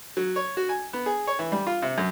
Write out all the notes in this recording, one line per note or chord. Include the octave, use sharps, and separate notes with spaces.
F#3
C#5
F#4
G#5
B3
G#4
C#5
E3
G3
F4
C3
F#2